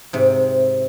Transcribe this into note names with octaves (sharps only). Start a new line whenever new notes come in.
G#2 C3